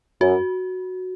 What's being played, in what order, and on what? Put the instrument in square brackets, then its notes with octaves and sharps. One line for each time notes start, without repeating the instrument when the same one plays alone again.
[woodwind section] F#2 [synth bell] F#4